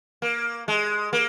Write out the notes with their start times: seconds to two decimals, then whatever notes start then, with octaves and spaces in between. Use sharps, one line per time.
0.22 A#3
0.68 G#3
1.13 A#3